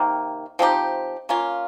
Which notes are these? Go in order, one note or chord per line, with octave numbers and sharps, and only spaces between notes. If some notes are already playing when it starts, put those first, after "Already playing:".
Already playing: C3 D#3 A#3
F3 C4 D#4 G4
A#3 C#4 F4